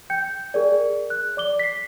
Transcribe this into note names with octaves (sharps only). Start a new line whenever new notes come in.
G5 G6 C#7
G#4 A#4 D5
F#6
D5 D6 G7
B6 C7